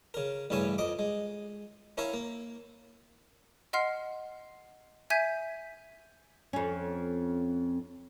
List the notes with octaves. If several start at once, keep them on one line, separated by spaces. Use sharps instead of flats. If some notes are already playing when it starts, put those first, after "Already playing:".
C#3 A#4
A1 G2 C#3 E4 C#5 G#5
F2 D#5 D6
G#3
C#4 E4 A#4 C#5 F5 A#5
A#3
D#5 F#5 C6 F6 C7
E5 G#5 G6 G#6 B6 D#7
F2 C#4